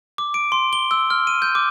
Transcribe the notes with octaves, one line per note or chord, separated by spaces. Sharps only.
D6
D7
C6
G7
E6
F6
D#7
G6
D6